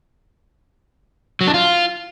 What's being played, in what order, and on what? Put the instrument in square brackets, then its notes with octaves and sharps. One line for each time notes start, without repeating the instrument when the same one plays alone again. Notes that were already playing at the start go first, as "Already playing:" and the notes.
[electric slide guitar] F#3
D4
F4